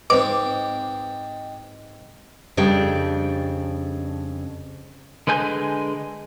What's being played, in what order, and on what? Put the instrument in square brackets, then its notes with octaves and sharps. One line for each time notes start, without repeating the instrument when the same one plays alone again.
[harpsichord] G#2 C4 [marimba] B4 C5 [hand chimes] D#5 G5 [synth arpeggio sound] D6
[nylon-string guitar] F2 C#3 G3 D4 G5
[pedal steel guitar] D3 G#3 B4 G#5 G6